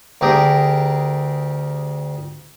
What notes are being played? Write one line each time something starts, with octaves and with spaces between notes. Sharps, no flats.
D2 G4 G#4 A#4 D#6